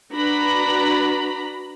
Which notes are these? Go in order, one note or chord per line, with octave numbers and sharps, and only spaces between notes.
D4 F#4 B4 A#5 B5